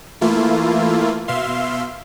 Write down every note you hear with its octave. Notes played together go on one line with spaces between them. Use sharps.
E3 A3 A#3 E4 F4
B2 E5 F5 C6